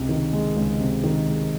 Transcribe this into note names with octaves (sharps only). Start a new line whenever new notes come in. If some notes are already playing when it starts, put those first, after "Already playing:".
Already playing: C#2 C3 G#3
D#3
G#3
C#2
C3
D#3
G#3